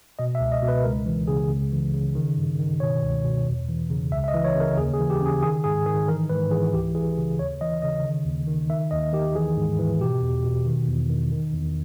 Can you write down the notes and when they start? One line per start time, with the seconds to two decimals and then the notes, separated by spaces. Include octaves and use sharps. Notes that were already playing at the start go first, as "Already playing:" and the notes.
0.19 B2 D#5
0.35 E5
0.40 C#2
0.52 D#5
0.62 B2
0.68 B4
0.84 C#2 A#4
1.06 E3
1.27 C#3 G#4
1.50 C#2
1.72 E3
1.94 C#3
2.15 D#3
2.37 G2
2.59 D#3
2.80 B2 C#5
3.03 C#2
3.24 B2
3.46 E2
3.68 E3
3.90 C#3
4.11 C#2 E5
4.24 E5
4.28 D#5
4.34 E3
4.45 C#5
4.55 C#3 A#4
4.77 D#2 G#4
4.94 G#4
4.99 E3
5.10 G4
5.21 C#3
5.26 G#4
5.42 D#3 G#4
5.64 G#2 G#4
5.86 D#3 G#4
6.08 E3 A#4
6.29 G#2 B4
6.51 E3 G#4
6.73 C#2 G4
6.95 E3 G#4
7.18 C#3
7.39 D#2 C#5
7.61 E3 D#5
7.82 C#3 D#5
8.04 D#3
8.26 D#2
8.48 D#3
8.70 D#3 E5
8.91 D#2 D#5
9.13 D#3 G4
9.35 E3 G#4
9.57 G#2
9.79 E3
10.01 B2 G4
10.22 E2
10.44 B2
10.66 D#3
10.88 E2
11.09 D#3
11.31 D#3
11.53 E2